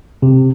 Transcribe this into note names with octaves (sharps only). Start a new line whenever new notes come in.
C3